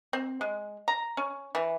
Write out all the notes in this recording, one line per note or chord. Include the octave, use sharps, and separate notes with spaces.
C4
G#3
A#5
C#4
E3